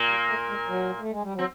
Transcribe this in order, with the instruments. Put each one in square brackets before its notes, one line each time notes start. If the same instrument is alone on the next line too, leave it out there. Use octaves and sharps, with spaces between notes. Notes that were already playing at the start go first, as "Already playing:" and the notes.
Already playing: [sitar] A#2 A#3
[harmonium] G3
A3
G#3
F#3
A3
G#3
G3
F#3
[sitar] C4